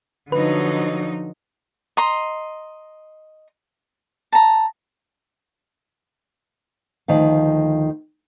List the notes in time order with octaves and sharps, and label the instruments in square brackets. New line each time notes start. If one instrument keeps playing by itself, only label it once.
[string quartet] D3 F#3 [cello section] F3 D#4 [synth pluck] B4
[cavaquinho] D#5 A#5 C6
A5 A#5
[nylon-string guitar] D2 D#3 F3 F5